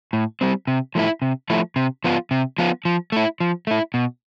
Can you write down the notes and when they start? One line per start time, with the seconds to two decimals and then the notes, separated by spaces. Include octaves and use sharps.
0.13 A2
0.41 G3 C4
0.67 C3
0.95 F3 A3 E4
1.22 C3
1.50 F3 A3 E4
1.76 C3
2.04 F3 B3 F4
2.31 C3
2.58 F3 B3 F4
2.85 F3
3.12 A3 E4
3.40 F3
3.67 A3 E4
3.94 B2